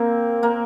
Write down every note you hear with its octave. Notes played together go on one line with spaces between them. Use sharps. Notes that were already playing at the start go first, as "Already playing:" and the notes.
Already playing: A#3 C4
A#3